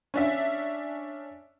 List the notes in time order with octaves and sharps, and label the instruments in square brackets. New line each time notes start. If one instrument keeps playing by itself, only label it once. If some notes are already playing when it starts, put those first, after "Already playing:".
[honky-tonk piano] C#4 D4 E5